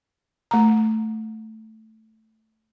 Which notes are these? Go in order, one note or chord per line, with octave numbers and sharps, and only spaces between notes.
A3 A#5